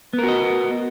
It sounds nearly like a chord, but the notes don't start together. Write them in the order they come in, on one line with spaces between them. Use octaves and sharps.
B3 A#4 F#4 D#5